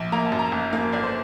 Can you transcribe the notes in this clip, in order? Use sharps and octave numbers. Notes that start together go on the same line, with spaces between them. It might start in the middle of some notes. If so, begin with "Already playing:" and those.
Already playing: A#1
A#3 A#5
A5
F#2
A#5
F#1
A#3
G1 D5
C5